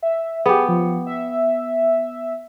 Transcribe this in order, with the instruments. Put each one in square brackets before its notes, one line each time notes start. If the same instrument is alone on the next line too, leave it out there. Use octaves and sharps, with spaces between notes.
[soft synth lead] E5
[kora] B3 G4 [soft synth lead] G#4
[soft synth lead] F3
E5